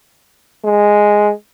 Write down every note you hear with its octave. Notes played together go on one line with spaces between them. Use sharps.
G#3